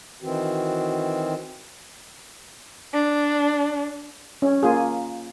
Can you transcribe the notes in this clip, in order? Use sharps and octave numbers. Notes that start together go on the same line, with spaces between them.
D#3 E3 C4 F#4
D4
C#4
A#3 F4 G#4